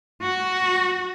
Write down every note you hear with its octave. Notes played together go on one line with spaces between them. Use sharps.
F#4